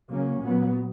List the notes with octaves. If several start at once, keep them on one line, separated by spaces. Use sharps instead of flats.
C#3 F#3 A#3 C#4
A#2 F#3 B3